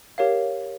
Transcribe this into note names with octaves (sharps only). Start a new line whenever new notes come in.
G4 A#4 C#5 F5